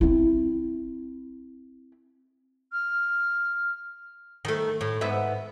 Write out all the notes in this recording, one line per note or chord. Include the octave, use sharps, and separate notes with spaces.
C4 E4
F6
D#3 A3
A2
G#2 B3 E5